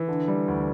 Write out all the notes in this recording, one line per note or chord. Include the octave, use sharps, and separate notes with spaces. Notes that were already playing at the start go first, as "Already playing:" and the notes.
Already playing: E3
D3
G3
D2